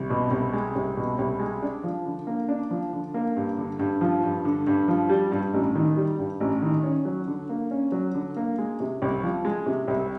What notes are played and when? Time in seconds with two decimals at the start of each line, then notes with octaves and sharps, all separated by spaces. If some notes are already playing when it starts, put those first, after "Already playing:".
Already playing: C2
0.10 B2
0.31 C2
0.53 G#3
0.75 C2
0.97 B2
1.18 C2
1.40 G#3
1.62 D4
1.83 F3
2.05 D3
2.27 A#3
2.49 D4
2.71 F3
2.93 D3
3.14 A#3
3.36 G2
3.58 D3
3.79 G2
4.01 F3
4.23 G2
4.45 D3
4.67 G2
4.88 F3
5.10 G3
5.32 G2
5.54 A1
5.75 D#3
5.97 G3
6.19 G2
6.40 A1
6.62 D#3
6.84 C#4
7.05 F#3
7.27 D3
7.49 A#3
7.71 C#4
7.92 F#3
8.14 D3
8.37 A#3
8.58 G#3
8.80 C3
9.02 C2
9.23 F3
9.45 G#3
9.66 C3
9.88 C2